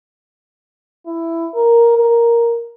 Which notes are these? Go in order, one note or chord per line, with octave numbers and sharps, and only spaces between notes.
E4
A#4
A#4